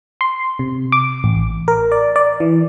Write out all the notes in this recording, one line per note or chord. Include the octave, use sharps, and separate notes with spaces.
C6
C3
D6
A1
A#4
D5
D5
E3